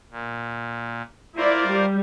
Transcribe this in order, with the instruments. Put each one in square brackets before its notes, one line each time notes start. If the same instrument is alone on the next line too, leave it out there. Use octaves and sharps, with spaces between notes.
[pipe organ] A#2
[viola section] E4 D5 [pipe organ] F4 A#4 C5
[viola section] G3